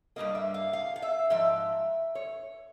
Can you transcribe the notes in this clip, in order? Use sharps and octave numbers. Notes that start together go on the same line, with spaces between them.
G2 E3 G3 A#3 D#5
E5
F5
F5
F5
E5
G#2 F3 E5
C#5